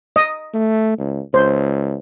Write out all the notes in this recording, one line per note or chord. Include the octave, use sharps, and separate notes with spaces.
D#5
A3
C#2
C#2 C5